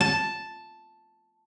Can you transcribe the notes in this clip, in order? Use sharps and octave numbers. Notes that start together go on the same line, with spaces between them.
A5